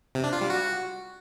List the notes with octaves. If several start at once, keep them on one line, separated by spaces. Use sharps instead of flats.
C3
D4
F4
G3
F#4